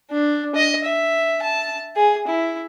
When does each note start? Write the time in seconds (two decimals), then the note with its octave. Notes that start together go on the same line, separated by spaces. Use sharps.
0.11 D4
0.55 D#5
0.85 E5
1.43 A5
1.96 G#4
2.27 E4